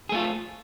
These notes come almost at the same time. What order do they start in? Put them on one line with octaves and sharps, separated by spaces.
G#4 A3 F4 A4